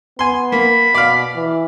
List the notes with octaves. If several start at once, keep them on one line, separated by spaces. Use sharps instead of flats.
B3 G#5 C6
A#3 B5
B2 D5 F5
E3